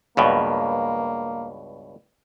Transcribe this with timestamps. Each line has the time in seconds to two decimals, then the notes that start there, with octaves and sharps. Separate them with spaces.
0.17 C#2 G2 B2 A#3